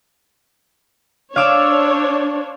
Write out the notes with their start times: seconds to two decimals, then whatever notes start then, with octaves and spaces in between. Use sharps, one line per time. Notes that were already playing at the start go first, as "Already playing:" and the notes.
1.36 D4 C5 C#5 F5 D6 E6